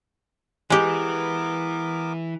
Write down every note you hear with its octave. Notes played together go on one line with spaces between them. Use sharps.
E3 G#3 B3 G4 A#4 D6